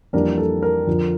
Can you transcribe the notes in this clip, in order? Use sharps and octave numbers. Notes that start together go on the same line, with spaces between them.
F2 E3 G3 A#3 D4 A#4
A4
A#4
F2 D3 F3